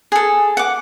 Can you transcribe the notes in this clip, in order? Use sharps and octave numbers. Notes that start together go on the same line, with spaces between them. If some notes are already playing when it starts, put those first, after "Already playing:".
G#4 A4
F#5 D6